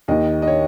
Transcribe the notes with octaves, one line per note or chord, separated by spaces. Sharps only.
D#2 D#3 D#5
D#5
C#5